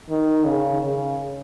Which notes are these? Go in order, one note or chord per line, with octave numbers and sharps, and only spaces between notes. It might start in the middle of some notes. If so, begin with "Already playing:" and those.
D#3
C#3
C#3